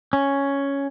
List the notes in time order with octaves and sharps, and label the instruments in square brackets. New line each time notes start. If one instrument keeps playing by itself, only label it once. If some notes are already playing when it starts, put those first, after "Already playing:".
[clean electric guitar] C#4